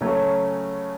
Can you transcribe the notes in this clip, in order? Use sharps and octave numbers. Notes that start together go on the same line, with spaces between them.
C#3 F#3 A3 C#4